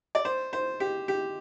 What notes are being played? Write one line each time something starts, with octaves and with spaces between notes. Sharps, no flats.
D5
C5
C5
G4
G4